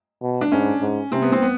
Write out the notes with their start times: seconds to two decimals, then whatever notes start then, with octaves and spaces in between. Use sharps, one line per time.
0.22 B2
0.41 D4
0.52 G#2 C#4
0.81 G#2
1.12 C3 C4
1.22 B3
1.32 C4
1.42 B3